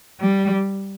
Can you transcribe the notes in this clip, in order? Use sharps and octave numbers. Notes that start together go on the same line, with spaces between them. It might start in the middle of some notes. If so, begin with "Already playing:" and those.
G3